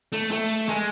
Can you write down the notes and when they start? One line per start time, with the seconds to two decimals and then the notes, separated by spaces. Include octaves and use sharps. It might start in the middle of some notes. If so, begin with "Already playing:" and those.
0.12 A3
0.31 A3
0.69 G#3